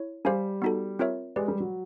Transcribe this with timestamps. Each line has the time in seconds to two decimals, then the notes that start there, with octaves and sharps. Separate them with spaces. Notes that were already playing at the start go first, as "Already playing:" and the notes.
Already playing: E4 C#5
0.25 G3 G4 C5 F5 G#5
0.62 B3 D#4 F#4 A4
0.99 C4 F4 A#4 C#5 E5
1.36 G#3 G4 B4 D5
1.48 G3
1.60 F#3